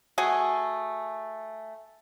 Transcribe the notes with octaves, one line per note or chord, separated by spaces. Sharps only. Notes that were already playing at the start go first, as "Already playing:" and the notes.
A3 F#4 G#4 G#5